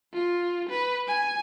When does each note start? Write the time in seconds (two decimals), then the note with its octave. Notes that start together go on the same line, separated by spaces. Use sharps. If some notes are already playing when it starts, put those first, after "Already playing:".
0.13 F4
0.69 B4
1.07 G#5